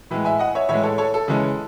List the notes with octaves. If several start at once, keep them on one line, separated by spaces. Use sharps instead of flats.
A2 E3 G#3
E5 G#5
D#5 F#5
C#5 E5
A2 E3 G#3 C#5 E5
A4 C#5
A4 C#5
A4
C#3 E3 G#3 C#4